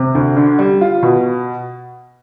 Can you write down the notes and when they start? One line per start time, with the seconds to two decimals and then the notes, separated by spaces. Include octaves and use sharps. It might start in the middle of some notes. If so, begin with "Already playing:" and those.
Already playing: C3
0.15 D2
0.36 D3
0.59 G3
0.81 F4
1.03 B2